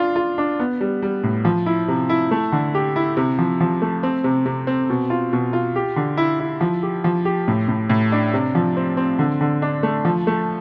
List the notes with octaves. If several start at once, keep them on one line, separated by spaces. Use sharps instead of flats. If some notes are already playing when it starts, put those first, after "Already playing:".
Already playing: D4 F4
F4
D4
B3
G3
G3
A2
F3
E4
C3
E4
A3
D3
G4
E4
C3
F3
F3
A3
C4
C3
C3
C4
B2
F4
B2
F4
G4
D3
E4
E4
F3
G4
F3
G4
A2
A2
A2
D4
C3
F3
C4
C4
D3
D3
D4
A3
F3
A3